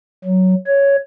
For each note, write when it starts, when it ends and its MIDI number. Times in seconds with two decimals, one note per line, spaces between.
0.24 0.55 54
0.67 0.96 73